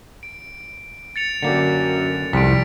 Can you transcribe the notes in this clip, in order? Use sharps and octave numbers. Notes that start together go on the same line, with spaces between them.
D7
A6 C#7 F7
F#2 D3 A#3 G4
C2 F2 G3 C4 B6 D7